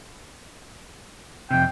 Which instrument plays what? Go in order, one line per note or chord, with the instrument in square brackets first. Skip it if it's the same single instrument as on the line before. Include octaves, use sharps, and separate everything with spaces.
[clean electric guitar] F2 C3 [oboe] G5